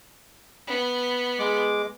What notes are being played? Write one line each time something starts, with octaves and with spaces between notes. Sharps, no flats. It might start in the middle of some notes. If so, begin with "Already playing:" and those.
B3
G#3 D6